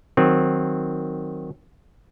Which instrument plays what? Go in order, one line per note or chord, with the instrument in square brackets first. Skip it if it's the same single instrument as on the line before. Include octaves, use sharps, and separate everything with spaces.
[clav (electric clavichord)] D#3 F#3 C4